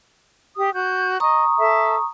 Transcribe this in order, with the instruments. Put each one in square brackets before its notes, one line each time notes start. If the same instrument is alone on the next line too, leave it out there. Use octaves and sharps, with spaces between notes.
[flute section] G4 D#6
F#4 G6
[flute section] D#5 [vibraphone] A#5 C#6 D#6
[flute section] A4 E5